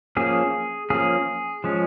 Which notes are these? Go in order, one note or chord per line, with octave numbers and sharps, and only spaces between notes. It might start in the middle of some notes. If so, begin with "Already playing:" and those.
F3 A#3 C#4 G#4
F3 A#3 C#4 G#4
F3 G#3 C#4